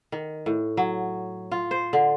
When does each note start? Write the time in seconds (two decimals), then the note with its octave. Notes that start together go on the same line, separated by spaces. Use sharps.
0.12 D#3
0.46 A2
0.77 F#3
1.52 F4
1.71 C5
1.93 D3